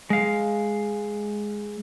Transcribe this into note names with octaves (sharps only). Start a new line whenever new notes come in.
G#3 F5